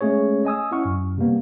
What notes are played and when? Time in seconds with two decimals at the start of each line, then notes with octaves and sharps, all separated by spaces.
0.01 G#3 A3 C#4 G#4 C#5
0.45 D#5 G#5 D#6 E6
0.71 C#4 E4 F#5 C#6 F6
0.86 F#2
1.18 C3 G3 A#3 B3